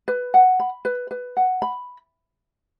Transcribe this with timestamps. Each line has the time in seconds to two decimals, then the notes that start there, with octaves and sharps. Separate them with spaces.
0.08 B4
0.34 F#5
0.60 B5
0.85 B4
1.11 B4
1.37 F#5
1.62 B5